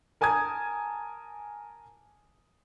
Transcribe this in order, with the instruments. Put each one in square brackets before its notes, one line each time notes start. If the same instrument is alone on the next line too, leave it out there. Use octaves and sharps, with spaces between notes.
[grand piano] A#4 G#5 A5 D#6 G#6